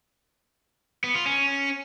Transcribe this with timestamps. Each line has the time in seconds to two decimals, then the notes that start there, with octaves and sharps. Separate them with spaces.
1.04 B3
1.15 F4
1.26 C#4